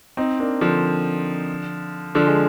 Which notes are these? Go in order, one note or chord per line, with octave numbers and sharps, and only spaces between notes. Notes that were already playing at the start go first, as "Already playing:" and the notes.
C4 D#4
A#3 D4
D3 F3
D3 F3
G#3